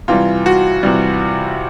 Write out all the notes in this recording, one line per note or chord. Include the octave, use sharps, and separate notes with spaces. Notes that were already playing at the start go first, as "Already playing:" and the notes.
C3 E3 G3 F4
F#4
C3 E3 G3